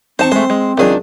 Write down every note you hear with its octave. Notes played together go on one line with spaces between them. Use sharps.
C4 D#4 C5 A5 C#6
G#3 A3 C5
G#3
C#2 D#3 F#3 D4 G#4